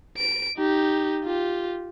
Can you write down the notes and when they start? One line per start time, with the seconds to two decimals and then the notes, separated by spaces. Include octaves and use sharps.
0.18 D7
0.57 D#4 G4
1.24 F4 G4